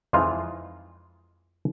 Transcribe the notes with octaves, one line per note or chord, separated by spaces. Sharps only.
F2 E3 G#3 D#4 F4